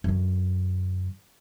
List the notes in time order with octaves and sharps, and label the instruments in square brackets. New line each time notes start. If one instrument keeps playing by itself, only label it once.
[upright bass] F#2 D3